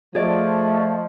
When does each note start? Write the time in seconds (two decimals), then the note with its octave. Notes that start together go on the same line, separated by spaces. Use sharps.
0.15 F3 A3 G#4 D5 D#5